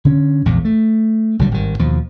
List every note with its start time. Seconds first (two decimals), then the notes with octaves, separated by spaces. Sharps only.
0.05 D3 C#4
0.46 A#1 E2 G#2
0.65 A3
1.39 B1 D3 F#3 G3
1.52 G#1 G2 D#3
1.79 D#2 B2 F3